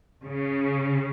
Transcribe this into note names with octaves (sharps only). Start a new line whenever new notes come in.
C#3